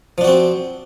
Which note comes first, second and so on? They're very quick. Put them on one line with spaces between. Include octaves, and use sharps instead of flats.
F3 D4 F#4 C4